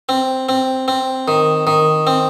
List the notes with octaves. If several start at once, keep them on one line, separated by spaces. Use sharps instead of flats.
C4
C4
C4
D#3
D#3
C4